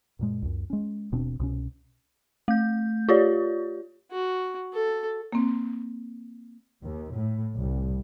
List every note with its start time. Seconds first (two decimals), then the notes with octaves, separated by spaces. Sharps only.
0.19 F#2 A#2 G#3
0.42 C#2 F#2
0.70 G#3 C#4
1.12 D#1 B2 C4 D4
1.39 C2 B2 C#4
2.48 A3 G6
3.09 F4 G4 C#5 D5
4.12 F#4
4.74 A4
5.32 A#3 C4
6.83 D#2
7.14 A2
7.56 C2